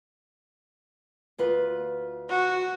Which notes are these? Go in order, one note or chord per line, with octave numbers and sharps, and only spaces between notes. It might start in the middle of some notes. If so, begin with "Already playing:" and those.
D2 F4 B4
F#4